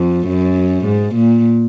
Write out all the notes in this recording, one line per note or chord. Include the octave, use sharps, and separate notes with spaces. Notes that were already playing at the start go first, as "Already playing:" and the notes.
Already playing: F2
F#2
G#2
A#2